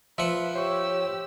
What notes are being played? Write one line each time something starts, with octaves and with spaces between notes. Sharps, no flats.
F3 B4 E5 F#5
G4 C5 C#5 C#6 E6